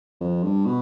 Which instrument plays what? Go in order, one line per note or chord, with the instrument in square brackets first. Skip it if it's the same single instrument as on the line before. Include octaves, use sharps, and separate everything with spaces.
[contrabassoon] F2
G2
B2